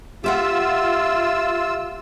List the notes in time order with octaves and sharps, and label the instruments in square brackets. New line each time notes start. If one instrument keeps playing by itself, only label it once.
[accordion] F4 E6 [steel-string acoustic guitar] G4 E5 F#5